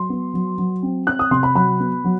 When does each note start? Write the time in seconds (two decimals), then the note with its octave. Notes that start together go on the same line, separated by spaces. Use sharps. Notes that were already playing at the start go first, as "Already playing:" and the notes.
Already playing: F#3 C6
0.10 B3
0.34 F#3
0.58 F#3
0.83 C4
1.07 C4 F#6
1.19 D#6
1.31 C3 C6
1.43 B5
1.55 F#3 B5
1.80 B3
2.04 F#3